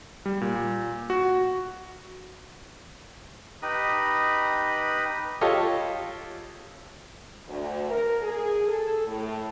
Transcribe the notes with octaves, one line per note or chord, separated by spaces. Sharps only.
G3
A#2
F#4
D#4 G4 B4 D#5 B5 D#6
F4 G4 A4 C#5 D#5
D2
A#4
G#4
A4
A2